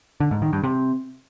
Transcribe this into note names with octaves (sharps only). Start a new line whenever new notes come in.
D3
G#2
D#3
G2
C3